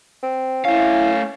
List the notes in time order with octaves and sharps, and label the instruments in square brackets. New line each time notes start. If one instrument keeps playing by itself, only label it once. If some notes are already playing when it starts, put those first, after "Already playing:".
[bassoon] C4
[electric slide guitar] A3 F5 [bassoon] C#4 [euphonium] E4